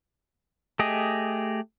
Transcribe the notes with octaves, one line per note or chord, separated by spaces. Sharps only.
A3 G4 G#4 D#5